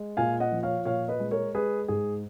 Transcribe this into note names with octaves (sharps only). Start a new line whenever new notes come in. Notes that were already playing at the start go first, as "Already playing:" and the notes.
Already playing: G#3
A#2 F5 G#5
D#5 F#5
F3
C#5 F5
A#2 C#5 F5
B4 D#5
G#3
A#4 C#5
G#3 G#4 B4
G#2 G#4